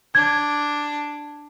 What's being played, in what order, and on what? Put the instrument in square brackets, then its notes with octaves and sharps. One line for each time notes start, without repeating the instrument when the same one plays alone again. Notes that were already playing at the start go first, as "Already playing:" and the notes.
[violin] D4 [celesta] G#6